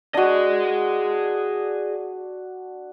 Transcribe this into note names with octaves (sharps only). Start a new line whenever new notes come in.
D4 F#4 G#4 D#5